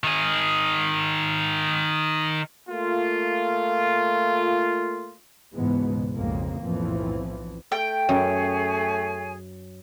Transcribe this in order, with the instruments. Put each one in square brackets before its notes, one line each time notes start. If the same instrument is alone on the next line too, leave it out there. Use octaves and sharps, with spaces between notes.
[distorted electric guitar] D#3 G#4
[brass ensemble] A3 A#3 F4
[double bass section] C#2 G#2 B2 E3 G#3 B3
B1 F2 G#2 C#3 G#3 A#3
B1 F2 A2 E3 F3
[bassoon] A3 [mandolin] G5
[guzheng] F#2 [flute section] G#4 C#5 G#5